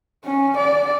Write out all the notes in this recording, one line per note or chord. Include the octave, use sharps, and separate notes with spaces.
C#4
D5